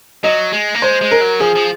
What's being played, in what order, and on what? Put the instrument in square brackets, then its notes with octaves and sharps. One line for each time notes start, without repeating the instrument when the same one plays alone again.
[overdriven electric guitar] F#3 [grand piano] D#5
[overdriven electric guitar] G#3
A#3
[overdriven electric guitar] G#3 [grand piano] C5
[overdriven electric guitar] G#3
[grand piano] A#4
[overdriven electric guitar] F#3
[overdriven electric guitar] F3 [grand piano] G#4
[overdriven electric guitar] F3